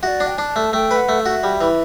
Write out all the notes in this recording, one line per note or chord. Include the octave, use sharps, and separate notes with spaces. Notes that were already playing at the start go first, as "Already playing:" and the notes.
F#4 D5 E5
D4
G5
D4 A5
A3
A3 G5
B4
F#5
A3
E5
F#4
G3
E3